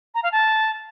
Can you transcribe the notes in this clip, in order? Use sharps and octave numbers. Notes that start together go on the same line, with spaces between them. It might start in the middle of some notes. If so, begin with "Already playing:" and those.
A#5
F5
A5